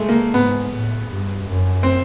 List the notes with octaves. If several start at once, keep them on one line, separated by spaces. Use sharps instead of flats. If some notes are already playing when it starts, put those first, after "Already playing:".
Already playing: G#3 A3
A#3
G#2 B3
A2
G2
F#2
C4